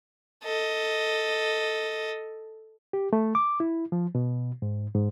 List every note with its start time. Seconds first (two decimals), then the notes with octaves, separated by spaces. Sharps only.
0.44 A4 D#5
2.93 G4
3.13 A3
3.35 D6
3.60 E4
3.92 F3
4.15 B2
4.62 G#2
4.95 G#2